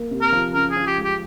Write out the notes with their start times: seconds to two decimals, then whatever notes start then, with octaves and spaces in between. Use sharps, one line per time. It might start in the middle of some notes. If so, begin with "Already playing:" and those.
Already playing: A#3
0.11 C3
0.21 A#4
0.32 F3
0.54 C#3 A#4
0.71 G#4
0.76 F3
0.87 G4
0.98 G#3
1.04 G4